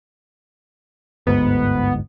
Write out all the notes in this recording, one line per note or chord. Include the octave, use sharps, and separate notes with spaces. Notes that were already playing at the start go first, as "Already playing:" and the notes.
G1 D2 G#2 B3